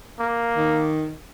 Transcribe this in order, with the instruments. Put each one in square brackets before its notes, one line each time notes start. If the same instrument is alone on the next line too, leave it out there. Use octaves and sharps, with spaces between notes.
[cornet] A#3
[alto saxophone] D#3